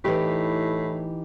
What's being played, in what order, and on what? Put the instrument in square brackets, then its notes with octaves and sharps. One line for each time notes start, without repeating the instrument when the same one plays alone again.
[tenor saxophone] A2 [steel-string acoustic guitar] E3 D#4 G4